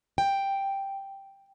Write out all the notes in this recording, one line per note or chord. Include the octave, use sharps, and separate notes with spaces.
G5